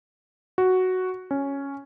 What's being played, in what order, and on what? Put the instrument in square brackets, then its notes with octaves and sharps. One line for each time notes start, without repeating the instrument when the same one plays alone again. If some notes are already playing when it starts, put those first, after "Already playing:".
[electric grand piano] F#4
C#4